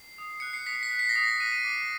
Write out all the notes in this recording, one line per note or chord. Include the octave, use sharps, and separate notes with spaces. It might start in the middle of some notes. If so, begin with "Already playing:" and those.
Already playing: C7
D#6
F#6 C#7
C7
D#6 B6
B6
F#6
C7
A#6
D#6 B6
B6
F#6 D#7
D#7
D6